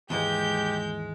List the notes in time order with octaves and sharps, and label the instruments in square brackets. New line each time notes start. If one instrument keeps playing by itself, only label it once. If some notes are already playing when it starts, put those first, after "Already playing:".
[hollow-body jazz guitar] D#2 G#2 E3 [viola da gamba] G#3 [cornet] G4 [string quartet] G6